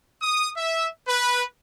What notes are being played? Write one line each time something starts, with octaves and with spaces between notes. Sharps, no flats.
D#6
E5
B4